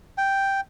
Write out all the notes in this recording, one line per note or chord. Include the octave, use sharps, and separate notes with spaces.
G5